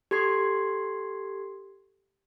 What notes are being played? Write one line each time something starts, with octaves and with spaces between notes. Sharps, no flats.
G4 A4 C6 G#6 C7